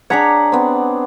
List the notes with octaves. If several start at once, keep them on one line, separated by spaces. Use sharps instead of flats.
D4 G#4 C#5 F#5 A#5 B6
B3 C4